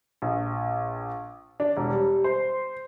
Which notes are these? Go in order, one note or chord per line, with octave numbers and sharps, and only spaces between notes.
A#1
D4
E1
G3
C5